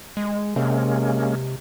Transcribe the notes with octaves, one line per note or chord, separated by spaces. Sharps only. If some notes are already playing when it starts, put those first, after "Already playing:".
G#3
C3 G#3 A#3 C#4